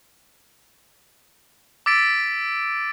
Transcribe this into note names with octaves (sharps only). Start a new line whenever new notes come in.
D6 E6 A6 B6 D7